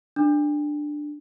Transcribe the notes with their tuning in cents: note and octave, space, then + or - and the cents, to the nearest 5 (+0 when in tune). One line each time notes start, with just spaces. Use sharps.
D4 +10